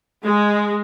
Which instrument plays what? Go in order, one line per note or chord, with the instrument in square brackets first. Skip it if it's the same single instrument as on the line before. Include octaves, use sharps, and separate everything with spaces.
[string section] G#3